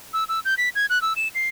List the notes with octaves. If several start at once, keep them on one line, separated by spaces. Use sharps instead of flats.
E6
E6
G6
B6
G#6
F#6
E6
E7
C7